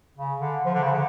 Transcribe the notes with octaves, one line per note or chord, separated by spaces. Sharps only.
C#3
D3
F3
D3
C#3
D3